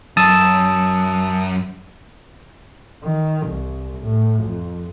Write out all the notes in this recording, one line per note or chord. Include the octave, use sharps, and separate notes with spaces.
F#2 A5 D#6 E6
D#3
C2
A2
F2